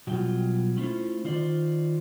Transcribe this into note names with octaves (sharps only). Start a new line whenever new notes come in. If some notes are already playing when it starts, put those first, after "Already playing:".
B2 F#3 G3 F4 G5
A3 C#4 E4 F4 C5
D#3 F4 C5 D5